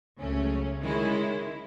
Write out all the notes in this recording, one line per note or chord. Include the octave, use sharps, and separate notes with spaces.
C#2 C#3 F#3 A3 C#4
D#3 G#3 C#4 E4